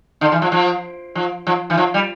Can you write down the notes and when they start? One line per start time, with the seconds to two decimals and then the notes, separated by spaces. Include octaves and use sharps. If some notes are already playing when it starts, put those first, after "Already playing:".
0.21 D3
0.32 E3
0.42 F3
0.52 F3
1.15 F3
1.47 F3
1.70 E3
1.78 F3
1.94 G3